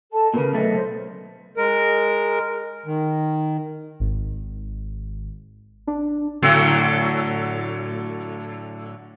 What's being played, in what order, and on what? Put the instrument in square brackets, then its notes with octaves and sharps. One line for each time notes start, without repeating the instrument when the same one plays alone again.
[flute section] A4 D#5 A5
[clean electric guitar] A#2 C#3 [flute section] A#4 B4
[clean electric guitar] B1 A3 [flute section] D#5
[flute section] C5
[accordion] G#3 A#4
D#3
[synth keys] G#1
D4
[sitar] A2 D3 F#3